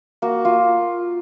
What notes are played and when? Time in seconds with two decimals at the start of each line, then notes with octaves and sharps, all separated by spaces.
0.22 A#3 F#4
0.45 A#3 F4